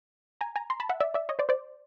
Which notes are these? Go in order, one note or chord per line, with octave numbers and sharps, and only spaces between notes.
G#5 A#5
G#5 A#5
A#5 C6
A5 B5
E5 F#5
D5 E5
D5 E5
C#5 D#5
C5 D5
C5 D5